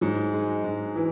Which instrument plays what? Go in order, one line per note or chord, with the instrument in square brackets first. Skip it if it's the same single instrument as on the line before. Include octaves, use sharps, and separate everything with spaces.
[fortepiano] G#2 [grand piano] F#3
[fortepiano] G#3
G#2
[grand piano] E3